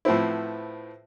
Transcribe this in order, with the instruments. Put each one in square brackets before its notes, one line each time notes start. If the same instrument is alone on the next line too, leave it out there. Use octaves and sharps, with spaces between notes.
[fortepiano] A2 F3 B3 C4 E4